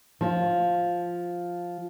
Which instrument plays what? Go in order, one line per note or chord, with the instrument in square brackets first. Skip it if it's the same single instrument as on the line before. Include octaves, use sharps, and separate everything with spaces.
[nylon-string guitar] F3 F4